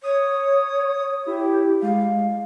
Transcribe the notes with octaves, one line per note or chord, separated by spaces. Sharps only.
C#5 D#6
E4 G4
G#3 F5